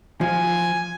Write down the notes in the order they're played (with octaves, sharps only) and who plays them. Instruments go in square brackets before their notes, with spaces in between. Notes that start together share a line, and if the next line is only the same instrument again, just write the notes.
[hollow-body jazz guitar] F3 [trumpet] G#5